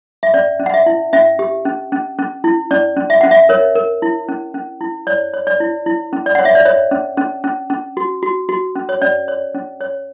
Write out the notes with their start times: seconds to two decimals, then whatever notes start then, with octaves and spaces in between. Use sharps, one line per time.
0.23 E5
0.34 C#4 D5
0.60 C#4
0.66 F#5
0.74 E5
0.86 E4
1.13 C#4 E5
1.39 G4
1.65 C#4
1.92 C#4
2.19 C#4
2.44 E4
2.71 C#4 D5
2.97 C#4
3.10 E5
3.21 C#4 F#5
3.31 E5
3.49 A#4 C#5
3.75 A#4
4.02 E4
4.28 C#4
4.54 C#4
4.81 E4
5.07 C#5 D5
5.34 C#5
5.47 D5
5.60 E4
5.86 E4
6.13 C#4
6.26 D5
6.35 C#5 F#5
6.45 E5
6.55 D5
6.65 C#5
6.91 C#4
7.17 C#4
7.44 C#4
7.70 C#4
7.97 F#4
8.23 F#4
8.49 F#4
8.76 C#4
8.89 C#5
9.01 C#4 D5
9.28 C#5
9.55 C#4
9.81 C#5